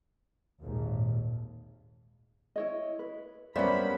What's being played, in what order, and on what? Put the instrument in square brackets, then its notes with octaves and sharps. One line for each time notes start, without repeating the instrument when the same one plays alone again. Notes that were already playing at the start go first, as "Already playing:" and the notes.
[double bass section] G#1 D#2 A#2
[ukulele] E4 C#5 D#5
B4
[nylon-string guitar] G3 E5 [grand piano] A#3 B3 C#4 [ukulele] C5 D5 [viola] B5